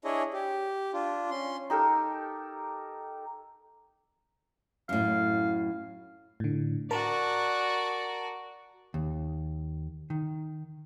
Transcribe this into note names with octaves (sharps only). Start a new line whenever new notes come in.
D4 E4 G#4 C#5 D#5
G4
D4 F4
C#4 C6
D#4 G4 A4 A#4
F#2 A2 F5
A2 D3
F#4 A#4 D5 A5 A#5
D#2
D#3